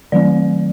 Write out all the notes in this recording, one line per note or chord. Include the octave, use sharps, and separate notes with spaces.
D#3 F#3 A3 C4 D5